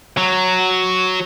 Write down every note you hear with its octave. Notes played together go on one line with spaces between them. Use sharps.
F#3